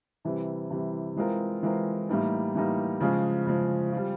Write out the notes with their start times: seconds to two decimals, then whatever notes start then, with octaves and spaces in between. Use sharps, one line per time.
0.25 C3 E3 G3
0.70 C3 E3 G3
1.16 E3 G#3 C4 F4 A#4
1.63 E3 G#3 C4 F4 A#4
2.09 A2 E3 G3 A#3 D#4
2.55 A2 E3 G3 A#3 D#4
3.01 C#3 F3 G#3
3.47 C#3 F3 G#3
3.93 G3 C4 F4